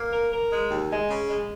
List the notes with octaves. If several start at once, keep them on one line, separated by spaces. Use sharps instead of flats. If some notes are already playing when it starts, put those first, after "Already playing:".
Already playing: A#3
A#4
A#4
G#3
D#2
G#3
C#3
G#3